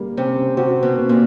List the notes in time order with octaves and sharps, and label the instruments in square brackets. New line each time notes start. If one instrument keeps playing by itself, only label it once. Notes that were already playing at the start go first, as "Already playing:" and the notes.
Already playing: [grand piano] G3 A#3
[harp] C3 [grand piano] C#4
[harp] C3 [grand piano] F#4
[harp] B2
[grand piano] A#3
[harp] A#2